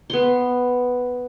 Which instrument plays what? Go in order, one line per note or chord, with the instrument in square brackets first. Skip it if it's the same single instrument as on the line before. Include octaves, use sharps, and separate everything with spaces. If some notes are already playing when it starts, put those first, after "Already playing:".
[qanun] B3 C6